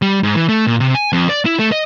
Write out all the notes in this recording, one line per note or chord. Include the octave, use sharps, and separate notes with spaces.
G3
G#2
E3
A3
A#2
C3
G#5
F2
D5
E4
A3
D#5